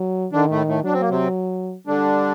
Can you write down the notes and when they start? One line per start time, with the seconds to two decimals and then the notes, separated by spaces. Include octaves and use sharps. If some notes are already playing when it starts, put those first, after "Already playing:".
Already playing: F#3
0.33 D3 D#3 D4
0.50 A2 A3
0.67 A2 A3
0.84 F#3 D4
0.93 C4
1.01 A#3
1.09 C3 C4
1.87 D3 G3 D4